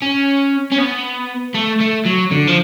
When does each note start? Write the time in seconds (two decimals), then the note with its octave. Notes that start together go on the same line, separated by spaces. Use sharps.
0.02 C#4
0.72 C#4
0.79 B3
1.54 A3
1.80 A3
2.05 F#3
2.31 D3
2.48 F3